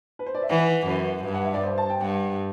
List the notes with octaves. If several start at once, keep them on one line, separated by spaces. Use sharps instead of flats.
B4
C5
D5
E5
E3 F#5
F#2 B4
G2
F#5
E5
D5
C5
A5
G5
G2 F#5